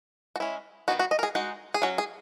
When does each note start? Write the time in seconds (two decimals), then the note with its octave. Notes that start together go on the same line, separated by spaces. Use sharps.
0.36 F#4
0.40 G#3 C#4 E4
0.88 D#3 F#3 B3 D#4 F#4
0.99 F#4
1.11 D#5
1.19 A#4
1.23 G#4
1.35 G#3 D#4 F#4
1.74 G#4
1.82 F#3 C#4 F#4
1.98 G#4